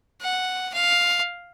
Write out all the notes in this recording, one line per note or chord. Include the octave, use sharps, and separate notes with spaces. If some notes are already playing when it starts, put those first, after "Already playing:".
F#5
F5